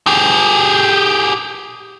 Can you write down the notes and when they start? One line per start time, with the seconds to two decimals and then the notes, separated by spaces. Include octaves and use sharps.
0.07 G4 G#4